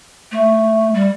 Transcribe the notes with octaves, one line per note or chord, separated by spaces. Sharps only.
A3
G3